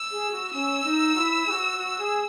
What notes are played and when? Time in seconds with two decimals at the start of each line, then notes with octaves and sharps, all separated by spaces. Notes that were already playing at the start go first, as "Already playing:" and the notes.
Already playing: E6
0.11 G#4
0.31 F#4
0.52 C#4 E6
0.84 D#4
1.15 F#4
1.19 E4
1.46 G#4
1.50 F#4
1.77 F#4
1.98 G#4